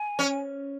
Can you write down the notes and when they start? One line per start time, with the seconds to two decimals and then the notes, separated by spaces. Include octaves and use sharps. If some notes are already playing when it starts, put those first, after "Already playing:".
Already playing: G#5
0.19 C#4